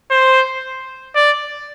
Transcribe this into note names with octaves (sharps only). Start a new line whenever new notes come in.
C5
D5